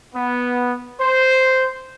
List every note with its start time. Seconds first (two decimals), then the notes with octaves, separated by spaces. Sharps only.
0.15 B3
1.01 C5